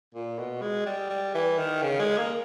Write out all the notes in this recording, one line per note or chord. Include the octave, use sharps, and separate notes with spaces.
A#2
B2
G#3
G3
G3
E3
D#3
C#3
G#3
A#3